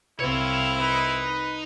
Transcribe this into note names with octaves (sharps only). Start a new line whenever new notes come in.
C2 C4 E4 C#5 F5
D#4 B4